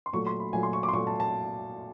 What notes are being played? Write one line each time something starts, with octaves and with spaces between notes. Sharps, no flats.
C6
A#2 F#3 A3 C#6
C6
B5
A#2 F#3 A3 G#5
C6
C#6
D6
C6
A#2 F#3 A3 C#6
A5
A5